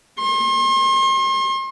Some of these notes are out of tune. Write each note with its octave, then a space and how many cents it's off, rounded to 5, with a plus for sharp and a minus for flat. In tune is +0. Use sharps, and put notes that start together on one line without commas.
C6 +40